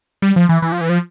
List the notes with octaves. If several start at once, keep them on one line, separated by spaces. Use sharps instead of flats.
G3
F3
E3
E3
F3
E3
F3